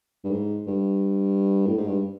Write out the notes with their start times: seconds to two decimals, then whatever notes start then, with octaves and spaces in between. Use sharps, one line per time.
0.24 G2
0.31 G#2
0.67 G2
1.67 A2
1.77 G#2
1.87 G2